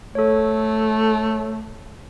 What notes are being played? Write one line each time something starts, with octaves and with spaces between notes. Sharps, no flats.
A3 A4 C#5